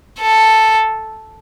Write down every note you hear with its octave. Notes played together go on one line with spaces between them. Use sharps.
A4